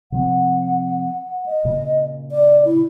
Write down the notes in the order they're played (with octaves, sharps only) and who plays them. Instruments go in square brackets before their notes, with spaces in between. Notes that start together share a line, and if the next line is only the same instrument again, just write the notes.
[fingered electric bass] C3 F3 C4 [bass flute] F#5
[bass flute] D#5
[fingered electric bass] A#2 C#3
[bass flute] D5
E4